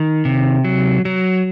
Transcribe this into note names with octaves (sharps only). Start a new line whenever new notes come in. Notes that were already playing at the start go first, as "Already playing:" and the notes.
Already playing: D#3
C3
F#3
F#3